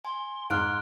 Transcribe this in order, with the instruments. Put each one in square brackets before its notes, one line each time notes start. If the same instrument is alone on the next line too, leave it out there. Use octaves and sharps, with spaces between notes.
[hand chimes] G#5 [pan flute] C6
[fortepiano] G#2 [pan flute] C6 [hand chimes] F6 F#6 D7